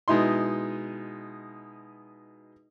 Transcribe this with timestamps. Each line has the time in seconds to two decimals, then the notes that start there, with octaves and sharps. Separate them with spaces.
0.08 B2 G#3 D#4 E4 C6